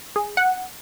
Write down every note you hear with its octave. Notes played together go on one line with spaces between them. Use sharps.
G#4
F#5